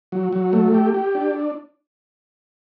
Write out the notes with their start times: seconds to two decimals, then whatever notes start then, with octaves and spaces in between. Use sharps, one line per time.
0.12 F#3
0.33 F#3
0.53 A3
0.74 G4
0.94 G4
1.15 D4